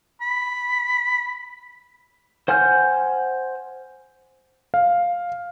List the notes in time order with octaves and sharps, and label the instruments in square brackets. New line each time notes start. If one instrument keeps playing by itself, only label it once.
[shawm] B5
[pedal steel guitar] C5 F#5 G#5 F6 G6
[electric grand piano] F5